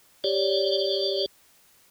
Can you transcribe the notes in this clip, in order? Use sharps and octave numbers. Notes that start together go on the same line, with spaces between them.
G4 C#5 D5